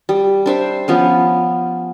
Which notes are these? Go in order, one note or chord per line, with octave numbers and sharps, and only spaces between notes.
G3
D4 C5 E5
F3 B3 C#4